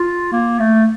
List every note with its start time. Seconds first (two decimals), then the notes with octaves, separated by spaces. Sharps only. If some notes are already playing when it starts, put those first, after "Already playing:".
Already playing: F4
0.32 A#3
0.60 A3